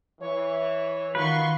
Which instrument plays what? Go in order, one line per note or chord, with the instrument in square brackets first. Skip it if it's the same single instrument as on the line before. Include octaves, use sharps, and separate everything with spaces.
[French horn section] E3 [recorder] C#5
[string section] D#3 C6 C#6 [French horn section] F4 F#4 [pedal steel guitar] B4